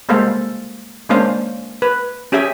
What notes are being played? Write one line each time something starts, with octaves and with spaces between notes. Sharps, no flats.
G3 G#3 A#3 A4 C5 F5
G#3 A#3 C#4 D4 C5 F5
B4
C#4 G4 G#4 E5 G5 G#5